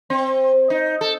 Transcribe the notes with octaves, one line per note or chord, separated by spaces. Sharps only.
C4
D#4
A4